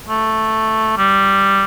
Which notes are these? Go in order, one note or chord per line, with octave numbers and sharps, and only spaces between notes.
A3
G3